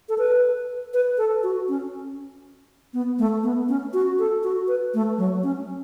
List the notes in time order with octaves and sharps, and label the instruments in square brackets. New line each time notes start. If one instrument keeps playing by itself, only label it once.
[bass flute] A4
B4
B4
A4
F#4
C#4
B3
A3
B3
C#4
F#4
A4
F#4
B4
A3
F#3
C#4